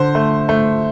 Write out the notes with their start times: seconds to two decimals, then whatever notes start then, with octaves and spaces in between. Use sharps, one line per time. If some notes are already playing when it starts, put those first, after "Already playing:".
Already playing: D3 C5
0.15 A3
0.49 A3